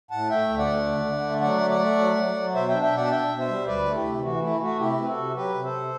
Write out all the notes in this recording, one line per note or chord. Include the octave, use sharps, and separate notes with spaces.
A2 F#5 A5
A3 E5 G5
D2
D5 F#5
A3
D3
D3
A3
F#3 D5 F#5
A3
D5 F#5
A3
F#3
F#3
F#3
B2 C5 E5
D4 E5 G5
E5 G5
B2 D5 F#5
A5
D4 E5 G5
B2
C5 E5
G3
D2 B4 D5
A3
E4 G4
C3
E3 F#4
A3 E4
A3 F#4
C3 E4 G4
C4 B4
F#4 A4
C3
F#3 G4 B4
C3
A4 C5
C3